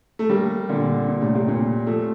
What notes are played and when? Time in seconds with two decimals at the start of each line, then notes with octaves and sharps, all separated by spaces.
0.19 A3
0.30 G3 A#3
0.69 A#2 D3
1.09 A#2
1.21 A2 C3
1.35 A2 C3
1.48 A#2
1.87 F3 A3